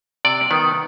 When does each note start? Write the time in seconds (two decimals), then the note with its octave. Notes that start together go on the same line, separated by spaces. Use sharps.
0.25 C3 D5
0.51 D#3 B3